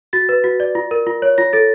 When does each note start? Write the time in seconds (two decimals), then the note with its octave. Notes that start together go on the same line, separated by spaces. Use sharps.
0.13 F#4 A6
0.29 B4
0.44 F#4
0.60 D5
0.75 F4
0.91 A#4
1.07 F4
1.22 C#5
1.38 F4 A#6
1.53 A4 A6